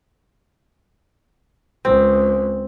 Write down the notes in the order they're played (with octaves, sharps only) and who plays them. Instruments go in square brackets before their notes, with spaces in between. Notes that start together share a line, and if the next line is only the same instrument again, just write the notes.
[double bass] C#2 [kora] C4